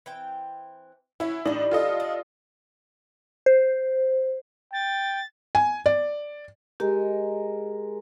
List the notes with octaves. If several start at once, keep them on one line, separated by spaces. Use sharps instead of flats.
E3 C4 G5
C#4 E4 F#4
A2 G3 A3 D4 D#4
F4 A4 D#5
D4
C5
G5 A6
G#5
D5
G#3 G4 A#4